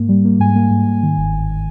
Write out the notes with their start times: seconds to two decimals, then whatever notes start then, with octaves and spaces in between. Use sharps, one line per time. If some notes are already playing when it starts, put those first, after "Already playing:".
Already playing: G#2 A#3
0.09 G3
0.25 A#3
0.39 G#2 G#5
0.56 A#3
0.70 G#2
0.86 G#2
1.03 D#3
1.17 G1
1.33 G1